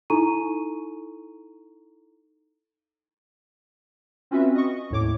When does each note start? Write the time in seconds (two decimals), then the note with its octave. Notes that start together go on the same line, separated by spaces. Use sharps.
0.10 D#4 E4 A4 A#5 C#6 D#7
4.31 C4 C#4 F4 F#4 B4 E5
4.55 D#5 C#6
4.90 D#2 A2 C#5 D6